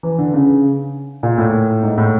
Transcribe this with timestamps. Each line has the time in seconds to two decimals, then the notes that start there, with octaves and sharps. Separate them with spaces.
0.03 E3
0.18 D3
0.34 C#3
1.23 A#2
1.38 A2
1.83 G#2
1.98 A2